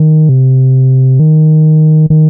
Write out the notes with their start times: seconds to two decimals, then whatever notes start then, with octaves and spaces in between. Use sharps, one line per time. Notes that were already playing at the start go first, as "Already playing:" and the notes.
Already playing: D#3
0.29 C3
1.20 D#3
2.10 D#3